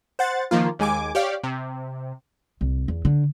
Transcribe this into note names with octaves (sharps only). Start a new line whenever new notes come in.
C5 F#5 A6
D#3 F3 A#3 F4
D#2 G#3 G#5 D6
G4 C#5 D5 F5
C3
C2
E2
D3